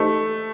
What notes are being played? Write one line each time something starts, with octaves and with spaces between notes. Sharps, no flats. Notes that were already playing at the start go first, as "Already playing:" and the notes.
Already playing: A3 D#4 G4 C5 D#5